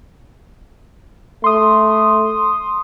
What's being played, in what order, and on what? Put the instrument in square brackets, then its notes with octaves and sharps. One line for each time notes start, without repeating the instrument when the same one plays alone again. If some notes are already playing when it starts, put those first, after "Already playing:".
[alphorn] A3 [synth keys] C6 D#6